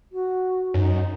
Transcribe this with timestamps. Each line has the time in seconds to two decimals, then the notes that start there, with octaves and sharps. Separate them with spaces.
0.12 F#4
0.74 F#2 D#4